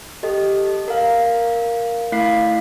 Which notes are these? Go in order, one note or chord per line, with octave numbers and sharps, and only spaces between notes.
G4 A4 D#5
A#4 F5
A3 E4 F5 B6 C7